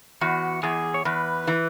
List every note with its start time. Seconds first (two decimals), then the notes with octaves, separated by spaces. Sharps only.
0.21 E2 F#4
0.63 E2 G#4
0.94 C#5
1.05 E2 B4
1.47 E3